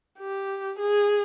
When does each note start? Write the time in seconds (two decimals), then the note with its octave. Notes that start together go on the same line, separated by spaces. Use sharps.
0.19 G4
0.79 G#4